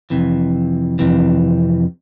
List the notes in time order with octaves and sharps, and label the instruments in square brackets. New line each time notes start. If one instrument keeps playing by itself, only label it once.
[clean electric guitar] F2 C3 E3
F2 C3 E3